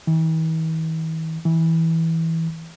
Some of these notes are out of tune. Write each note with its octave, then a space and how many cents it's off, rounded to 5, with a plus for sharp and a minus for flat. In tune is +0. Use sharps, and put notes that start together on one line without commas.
E3 -45
E3 -15